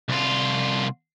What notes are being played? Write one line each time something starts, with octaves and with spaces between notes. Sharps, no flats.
C2 F4